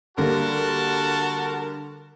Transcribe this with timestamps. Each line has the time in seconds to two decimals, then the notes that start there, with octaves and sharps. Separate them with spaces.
0.18 D3 G3 A#3 F#4 A#4 A5